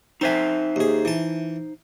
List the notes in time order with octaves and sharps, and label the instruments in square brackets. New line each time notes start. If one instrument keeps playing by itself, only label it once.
[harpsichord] C4 G#5 [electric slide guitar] D#4 C5 E5
[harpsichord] D#2 G#4
E3 A5